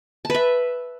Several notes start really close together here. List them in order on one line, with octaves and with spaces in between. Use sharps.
A5 B4 E5